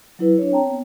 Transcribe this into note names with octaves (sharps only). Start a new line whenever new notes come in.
F#3 E4 B4
D4 C#5
C4 C#5 G5 A5 A#5
B3